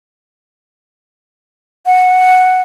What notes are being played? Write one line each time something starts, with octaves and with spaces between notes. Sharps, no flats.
F#5